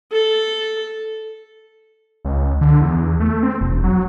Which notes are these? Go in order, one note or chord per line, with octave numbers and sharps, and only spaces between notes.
A4
C#2
D3
E2
A3
C4
E1
F#3